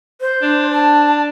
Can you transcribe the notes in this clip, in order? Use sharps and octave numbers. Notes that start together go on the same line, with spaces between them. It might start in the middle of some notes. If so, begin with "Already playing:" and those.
C5
D4
A5